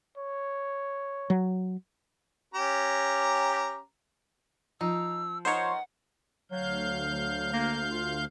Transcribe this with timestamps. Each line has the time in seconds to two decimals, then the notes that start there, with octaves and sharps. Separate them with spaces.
0.18 C#5
1.30 F#3
2.54 C#4 G4 A#5
4.81 F3 D#4 E6
5.45 B3 D#4 A#4 C5 C#5 F#5
6.51 D2 F#3 F5 G6
7.11 F#3
7.53 A#3
7.91 F4